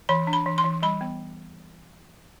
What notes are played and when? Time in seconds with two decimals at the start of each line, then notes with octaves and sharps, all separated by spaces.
0.09 E3 B5
0.27 D4
0.33 B5
0.46 E3
0.58 C6
0.64 E3
0.83 G3 B5
1.01 B3